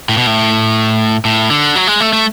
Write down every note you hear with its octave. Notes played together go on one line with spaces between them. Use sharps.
A2
B2
A2
A2
D3
F#3
G#3
A3
A3